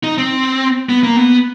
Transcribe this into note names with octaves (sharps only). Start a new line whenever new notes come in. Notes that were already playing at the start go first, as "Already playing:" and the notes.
D#4
C4
B3
A#3
B3